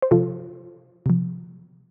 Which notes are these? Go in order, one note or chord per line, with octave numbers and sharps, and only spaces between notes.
C5
C3 F3 F4 A4
C3 F3